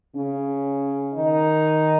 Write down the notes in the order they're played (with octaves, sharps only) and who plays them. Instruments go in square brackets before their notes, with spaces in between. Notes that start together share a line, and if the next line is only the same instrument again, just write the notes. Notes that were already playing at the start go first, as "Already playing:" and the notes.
[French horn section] C#3 C#4
D#3 D#4